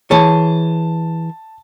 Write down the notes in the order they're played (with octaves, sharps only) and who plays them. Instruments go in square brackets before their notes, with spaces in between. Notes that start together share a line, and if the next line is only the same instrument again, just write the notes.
[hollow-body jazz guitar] E3 G#4 C#5 [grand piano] A5